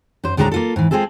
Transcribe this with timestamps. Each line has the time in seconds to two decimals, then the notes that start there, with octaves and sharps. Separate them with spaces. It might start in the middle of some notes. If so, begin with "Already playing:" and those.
0.24 F#2 C5
0.37 D2 A2 G#3 D4 C5 A#5
0.52 A#3 F4 A4
0.76 G#2 E3
0.91 G#3 C4 F4 G#4 A4